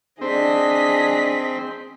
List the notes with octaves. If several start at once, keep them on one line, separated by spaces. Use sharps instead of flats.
C4 D4 G#4 D#5 B6